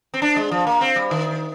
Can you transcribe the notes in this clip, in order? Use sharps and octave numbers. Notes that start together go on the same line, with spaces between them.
C4
D4
G#3
F3
A#3
C4
G3
D#3